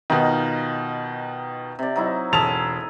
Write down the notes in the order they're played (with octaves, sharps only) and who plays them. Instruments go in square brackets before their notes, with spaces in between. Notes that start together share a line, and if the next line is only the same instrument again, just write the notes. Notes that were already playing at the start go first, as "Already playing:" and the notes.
[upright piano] B2 D#3 [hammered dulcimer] D#4 F4
[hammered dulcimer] C3 D5
F#3 D#4 E4
[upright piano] E1 A5 F7 [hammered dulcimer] G#4 A4